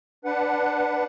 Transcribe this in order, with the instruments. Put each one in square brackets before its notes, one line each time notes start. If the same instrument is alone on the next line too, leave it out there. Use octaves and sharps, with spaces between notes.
[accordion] D4 B4 F#5